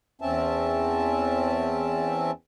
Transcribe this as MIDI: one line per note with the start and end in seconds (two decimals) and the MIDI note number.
0.21 2.31 40
0.21 2.31 60
0.21 2.31 61
0.21 2.31 76
0.21 2.31 81